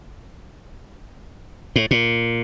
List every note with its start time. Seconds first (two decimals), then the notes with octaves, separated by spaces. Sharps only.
1.76 A2
1.91 A#2